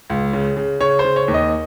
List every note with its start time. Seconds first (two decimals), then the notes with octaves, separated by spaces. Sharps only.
0.10 C#2
0.33 C#3
0.57 C#3
0.80 C#3 C#5
0.99 C5
1.04 C#3
1.16 C#5
1.28 D#2
1.34 D#5